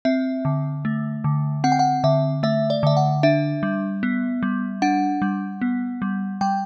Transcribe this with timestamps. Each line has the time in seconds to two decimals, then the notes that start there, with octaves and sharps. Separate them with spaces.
0.05 C4 E5
0.45 D3
0.85 A3
1.24 D3
1.64 C4 F#5
1.72 G5
1.79 F#5
2.04 D3 E5
2.43 A3 E5
2.70 D5
2.83 D3 E5
2.97 F#5
3.23 D4 E5
3.63 G3
4.03 B3
4.43 G3
4.82 D4 F#5
5.22 G3
5.61 B3
6.02 G3
6.41 G3 G5